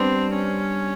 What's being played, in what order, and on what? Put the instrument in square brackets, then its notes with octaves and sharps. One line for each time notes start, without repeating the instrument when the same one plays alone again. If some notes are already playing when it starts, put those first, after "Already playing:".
Already playing: [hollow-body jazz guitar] G3 B3 D4 [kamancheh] C4
[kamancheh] C#4